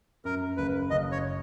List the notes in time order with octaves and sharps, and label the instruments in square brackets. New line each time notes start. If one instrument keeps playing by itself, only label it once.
[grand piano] F#2 [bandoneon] A#4
[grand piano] F#1 [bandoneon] B4
[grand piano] F#1 [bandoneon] D#5
[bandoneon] C#5